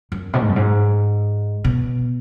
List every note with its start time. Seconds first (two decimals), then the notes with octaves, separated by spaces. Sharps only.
0.12 F#2
0.33 B2
0.42 G#2
0.49 F#2
0.56 G#2
1.64 B2